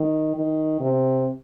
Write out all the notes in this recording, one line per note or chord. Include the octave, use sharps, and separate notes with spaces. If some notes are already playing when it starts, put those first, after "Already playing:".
Already playing: D#3
D#3
C3